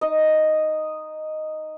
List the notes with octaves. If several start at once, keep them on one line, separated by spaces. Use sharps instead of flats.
D#4 D#5